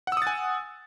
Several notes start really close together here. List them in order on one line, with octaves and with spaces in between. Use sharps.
F#5 E6 D#6 A6 G#5